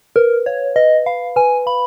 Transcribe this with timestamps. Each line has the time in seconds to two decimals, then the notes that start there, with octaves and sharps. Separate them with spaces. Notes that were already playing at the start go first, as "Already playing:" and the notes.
0.16 A#4 B4
0.46 C#5 F5
0.76 B4 D#5
1.06 F5 B5
1.36 B4 G#5
1.66 F5 B5